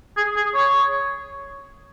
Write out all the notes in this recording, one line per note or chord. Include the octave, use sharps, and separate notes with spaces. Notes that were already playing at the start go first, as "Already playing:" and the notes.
G#4
G#4
C#5